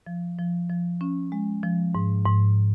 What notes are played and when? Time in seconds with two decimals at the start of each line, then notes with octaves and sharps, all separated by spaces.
0.07 F3
0.38 F3
0.70 F3
1.01 C#4
1.32 G#3
1.63 F3
1.95 G#2
2.26 G#2